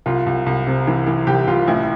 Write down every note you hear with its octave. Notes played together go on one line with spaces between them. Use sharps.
C2 F4
C2
C2
C3
E3
E3
C2 G4
C2 F4
A1 E4